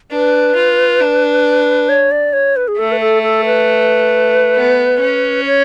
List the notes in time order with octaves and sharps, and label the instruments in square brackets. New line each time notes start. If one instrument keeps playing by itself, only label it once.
[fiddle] D4 [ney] B4
[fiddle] F4
D4
[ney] C#5
D5
C#5
B4
G#4
[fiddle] A3 [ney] A4
[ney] B4
A4
A4
B4
[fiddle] B3
C#4
[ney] C#5